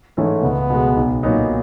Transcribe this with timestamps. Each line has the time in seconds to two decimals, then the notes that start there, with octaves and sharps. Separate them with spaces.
0.17 G#2 E3 A3 C#4
0.43 C#2 B3
0.70 B2 G#3
0.97 B1
1.23 A#2 F#3 B3 D#4